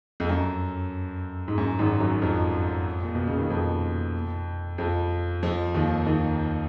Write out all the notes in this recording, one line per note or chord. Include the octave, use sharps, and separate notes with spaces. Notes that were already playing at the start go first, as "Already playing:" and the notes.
F2
F#2
G#2
F#2
G#1 G#2
F#2 F#3
F2 F3
A#2
B2
C#3
D#3
F2 F3
F2 F3
F2 F3
D#2 D#3
D#2 D#3